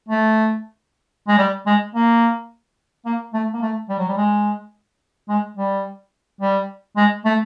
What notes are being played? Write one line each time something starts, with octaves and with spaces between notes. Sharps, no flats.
A3
G#3
G3
G#3
A#3
A#3
A3
A#3
A3
G3
F#3
G3
G#3
G#3
G3
G3
G#3
A3